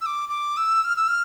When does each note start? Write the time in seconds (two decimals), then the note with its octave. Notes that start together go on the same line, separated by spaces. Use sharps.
0.01 E6
0.06 D6
0.29 D6
0.57 E6
0.84 F6
0.96 E6
1.08 F6